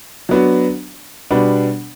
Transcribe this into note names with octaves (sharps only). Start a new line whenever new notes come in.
F#3 B3 D4 F#4
B2 G3 B3 D4